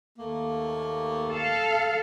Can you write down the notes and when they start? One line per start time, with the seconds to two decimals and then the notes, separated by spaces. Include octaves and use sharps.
0.18 D#2 A3 A#3
1.29 A4 F5